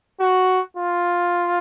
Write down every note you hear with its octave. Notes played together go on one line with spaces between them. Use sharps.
F#4
F4